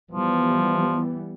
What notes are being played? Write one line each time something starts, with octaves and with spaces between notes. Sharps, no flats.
E3 F3 G3 B3